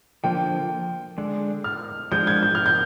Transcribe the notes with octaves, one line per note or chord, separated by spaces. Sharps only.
D3 F3 A#3 G5
D3 G#3 D4
F6
F3 G#3 D4 F4 G6
G#6
G6
F6
G6